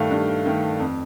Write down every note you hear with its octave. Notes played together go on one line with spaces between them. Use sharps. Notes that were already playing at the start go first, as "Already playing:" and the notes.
Already playing: G2 D#3 A3 F5
G2
D#3 A3
F2